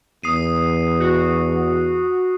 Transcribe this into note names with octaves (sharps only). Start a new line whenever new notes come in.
E2 D#6 C7 D#7
F#4